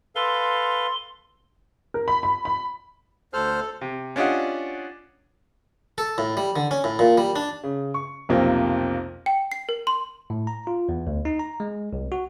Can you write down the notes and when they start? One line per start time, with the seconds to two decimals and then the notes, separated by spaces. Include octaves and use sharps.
0.16 A4 B4 F5 C6
1.94 A#4
2.08 B5
2.23 B5
2.45 B5
3.33 D2 A4 C5 F6
3.81 C3
4.16 C#4 D4 F4 G4 D#5 F#5
5.98 A4
6.18 A2
6.37 G3
6.56 D3
6.71 C#4
6.84 A2
6.99 A#2
7.18 G3
7.36 D4
7.63 C#3
7.94 C#6
8.29 B1 F2 C3 A#3
9.26 G5
9.52 C7
9.69 A#4
9.87 C6
10.30 A2
10.47 A#5
10.67 F4
10.89 E2
11.07 D2
11.25 D#4
11.39 A#5
11.60 G#3
11.93 C2
12.12 F#4